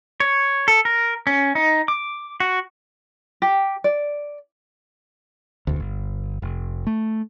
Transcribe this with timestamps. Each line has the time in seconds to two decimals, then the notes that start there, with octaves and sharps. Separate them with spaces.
0.20 C#5
0.68 A4
0.85 A#4
1.27 C#4
1.55 D#4
1.88 D6
2.40 F#4
3.42 G4
3.84 D5
5.67 E1 D2
5.80 G1
6.42 F1
6.87 A3